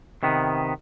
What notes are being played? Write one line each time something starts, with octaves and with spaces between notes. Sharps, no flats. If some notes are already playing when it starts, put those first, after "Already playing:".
C3 D#3 B3